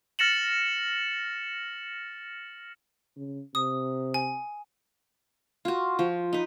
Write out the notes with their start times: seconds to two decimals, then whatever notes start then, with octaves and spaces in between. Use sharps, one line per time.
0.19 F6 A6 A#6 C#7 E7 F#7
3.16 C#3
3.55 C3 D#6
4.14 G#5
5.65 F4 F#4
5.99 F3
6.33 D#4 B4